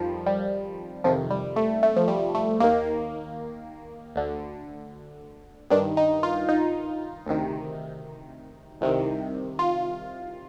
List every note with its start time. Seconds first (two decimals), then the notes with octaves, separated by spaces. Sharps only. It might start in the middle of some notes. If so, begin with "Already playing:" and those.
Already playing: F2 D#3 F3 G3
0.27 G3
1.04 F2 C3 D#3 F3
1.30 G3
1.56 A3
1.83 A3
1.96 F3
2.08 G3
2.35 A3
2.60 D#2 D#3 A#3
4.16 D2 D3
5.70 G2 D#3 D4
5.97 D#4
6.23 F4
6.49 D#4
7.27 D2 C3 D#3
8.81 C2 C3 D#3
9.59 F4